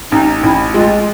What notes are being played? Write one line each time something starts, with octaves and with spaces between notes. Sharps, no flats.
A1 D#4
A1 E4
G#3 F4